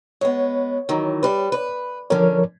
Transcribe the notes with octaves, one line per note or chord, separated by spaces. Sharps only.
G#3 B3 C#5
D#3 E3 F#3
G3 B4
B4
D3 F3 C#4 A#4 C#5